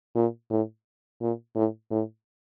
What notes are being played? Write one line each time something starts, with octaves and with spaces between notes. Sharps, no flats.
A#2
A2
A#2
A2
A2